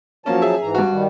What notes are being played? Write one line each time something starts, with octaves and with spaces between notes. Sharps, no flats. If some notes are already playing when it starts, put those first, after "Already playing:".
F3 F#3 A#3 C#4 A5
G#4 E5
G#2 E3 A#5
G2 F#4
D#3 G3